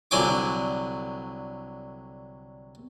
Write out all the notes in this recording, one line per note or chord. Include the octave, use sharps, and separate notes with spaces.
C2 D3 F#3 G#5 D6